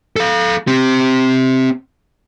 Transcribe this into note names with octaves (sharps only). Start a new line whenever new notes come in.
A4 F5
C4 G4